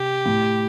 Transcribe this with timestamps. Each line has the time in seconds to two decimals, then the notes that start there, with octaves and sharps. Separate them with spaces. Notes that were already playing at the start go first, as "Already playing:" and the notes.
Already playing: C3 G4
0.26 A2